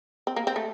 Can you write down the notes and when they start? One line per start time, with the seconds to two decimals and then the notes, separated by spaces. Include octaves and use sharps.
0.27 C4
0.36 A#3
0.47 C4
0.56 A3